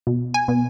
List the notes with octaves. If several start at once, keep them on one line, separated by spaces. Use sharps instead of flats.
B2
G#5
B2